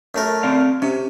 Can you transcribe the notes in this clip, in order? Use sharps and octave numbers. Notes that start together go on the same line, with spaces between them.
F#2 A3 A#4
C4 D5 F5
C3 C#4